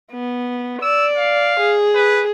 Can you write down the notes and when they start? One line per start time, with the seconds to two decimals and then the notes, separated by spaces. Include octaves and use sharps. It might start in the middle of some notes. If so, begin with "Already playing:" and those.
0.12 B3
0.83 D5 E6
1.17 F5
1.60 G#4
1.95 B4